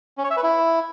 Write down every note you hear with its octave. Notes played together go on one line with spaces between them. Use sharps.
C#4
C#5
E5
B4
E4